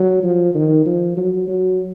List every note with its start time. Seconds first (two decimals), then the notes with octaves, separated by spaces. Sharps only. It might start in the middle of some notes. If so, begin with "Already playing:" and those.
Already playing: F#3
0.23 F3
0.55 D#3
0.86 F3
1.17 F#3
1.48 F#3